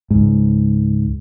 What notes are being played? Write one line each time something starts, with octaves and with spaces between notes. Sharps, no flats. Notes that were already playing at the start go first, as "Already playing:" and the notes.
C#2 G#2